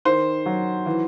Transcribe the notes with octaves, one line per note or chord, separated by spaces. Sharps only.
D#3 C5
F#3
E3